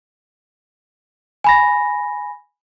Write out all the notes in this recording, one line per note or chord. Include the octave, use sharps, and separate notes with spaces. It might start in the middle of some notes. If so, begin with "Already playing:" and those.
G#5 B5 A#6